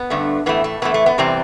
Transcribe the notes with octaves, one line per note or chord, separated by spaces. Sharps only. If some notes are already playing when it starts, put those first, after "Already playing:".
Already playing: B3
G2 D3 A3
A2 E3 A3 B3
A3
A2 E3 A3 B3
A3
B3
E2 C3 E3 G3 C4